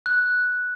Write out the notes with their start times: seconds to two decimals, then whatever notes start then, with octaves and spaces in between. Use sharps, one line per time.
0.06 F#6